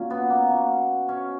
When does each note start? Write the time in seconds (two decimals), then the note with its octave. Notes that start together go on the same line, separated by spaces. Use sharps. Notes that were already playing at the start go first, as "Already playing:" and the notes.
Already playing: A#2 F#3 C#4
0.10 B3
0.30 A#3
0.49 B2 F#3
1.09 C#4